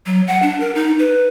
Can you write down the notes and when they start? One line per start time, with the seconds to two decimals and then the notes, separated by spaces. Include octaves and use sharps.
0.06 F#3
0.27 F#5
0.42 D4
0.60 A#4
0.75 D#4
0.99 B4